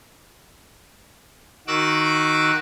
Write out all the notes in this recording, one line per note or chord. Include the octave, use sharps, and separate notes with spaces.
D#3 F#4 D6 E6 F#6